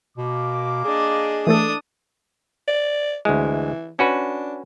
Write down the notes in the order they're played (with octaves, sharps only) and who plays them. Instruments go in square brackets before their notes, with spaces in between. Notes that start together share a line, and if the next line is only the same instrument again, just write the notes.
[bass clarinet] B2 [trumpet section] A#3 D6
[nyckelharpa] D4 D#5 [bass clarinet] G#4
[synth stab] E3 A3 A4 [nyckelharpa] D4 D#6
[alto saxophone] D5
[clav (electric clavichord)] D2 G#3 [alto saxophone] E3
[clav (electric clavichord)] C#4 F#4 B4 [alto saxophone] D4